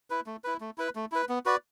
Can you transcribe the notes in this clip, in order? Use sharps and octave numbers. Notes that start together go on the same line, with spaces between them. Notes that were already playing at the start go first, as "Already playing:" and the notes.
E4 B4
A3
E4 B4
A3
E4 B4
A3
E4 B4
B3
F#4 B4 D5